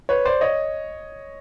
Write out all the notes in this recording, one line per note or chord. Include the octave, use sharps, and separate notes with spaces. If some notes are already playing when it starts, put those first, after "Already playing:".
B4 C#5
C5 D5
C#5 D#5